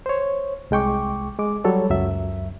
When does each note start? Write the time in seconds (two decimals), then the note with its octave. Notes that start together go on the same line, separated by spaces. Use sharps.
0.06 C5 C#5
0.71 C2 G#3 G5 C#6 D6
1.39 G#3 D6
1.64 F#3 G3 A4 C#5
1.90 C#2 F#2 F#3 E5